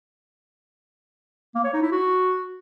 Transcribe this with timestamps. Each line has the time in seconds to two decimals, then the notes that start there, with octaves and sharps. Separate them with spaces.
1.55 A#3
1.64 C#5
1.73 D#4
1.83 E4
1.92 F#4